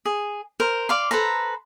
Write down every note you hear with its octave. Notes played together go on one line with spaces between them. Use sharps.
G#4
A#4 C5
D5 F5 C6
A4 B4 C5 A#5